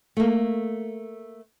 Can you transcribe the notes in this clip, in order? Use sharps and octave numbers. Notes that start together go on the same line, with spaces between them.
A3 A#3